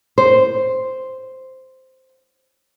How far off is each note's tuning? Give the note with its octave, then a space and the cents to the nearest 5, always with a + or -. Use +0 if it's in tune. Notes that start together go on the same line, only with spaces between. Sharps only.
C5 -5